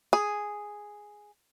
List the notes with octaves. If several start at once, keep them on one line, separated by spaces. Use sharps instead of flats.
G#4